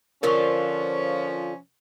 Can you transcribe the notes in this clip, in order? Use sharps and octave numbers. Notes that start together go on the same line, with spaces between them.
D3 F3 C#4 F4 A#4 C5 C#6